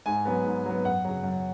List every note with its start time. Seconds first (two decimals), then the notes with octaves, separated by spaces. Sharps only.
0.06 G#2 G#5
0.25 F#3 B3
0.45 G#2
0.66 F#3 B3
0.85 F#2 F#5
1.05 C#3 F#3
1.24 F#2